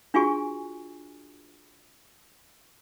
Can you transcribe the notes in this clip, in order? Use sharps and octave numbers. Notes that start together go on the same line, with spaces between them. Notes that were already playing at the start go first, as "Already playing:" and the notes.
D4 F4 F#4 G#4 G#5 C#6